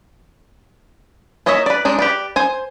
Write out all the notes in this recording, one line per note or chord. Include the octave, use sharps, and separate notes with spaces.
A#3 D#4 C#5 D#5 E5
B4 D5
G#3 D4 D#4
G4 B4 D5
C5 G#5